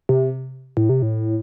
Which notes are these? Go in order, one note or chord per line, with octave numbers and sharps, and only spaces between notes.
C3
A2
C3
A2